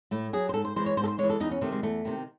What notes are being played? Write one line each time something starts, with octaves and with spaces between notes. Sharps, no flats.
A2 A3
F#3 G#4
C5
G#2 A4
C5
E3 G#3 C5
C#5
G#2 C5
A4
C5
E3 G#3 C#5
A4
E2 D#4
C#4
C3 D#3 A3
G#3
E2 A3
C3 D#3